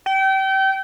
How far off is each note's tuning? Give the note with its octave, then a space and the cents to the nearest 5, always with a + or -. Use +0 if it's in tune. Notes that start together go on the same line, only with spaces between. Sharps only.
G5 -30